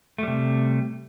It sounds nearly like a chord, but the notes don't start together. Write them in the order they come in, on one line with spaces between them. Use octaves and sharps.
A3 G3 C3